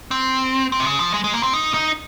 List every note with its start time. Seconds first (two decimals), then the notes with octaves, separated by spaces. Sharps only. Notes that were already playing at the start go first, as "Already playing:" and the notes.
0.11 C4
0.72 C4
0.80 C3
0.86 C#3
0.99 F3
1.14 G#3
1.24 G#3
1.33 A#3
1.43 C4
1.54 D#4
1.74 D#4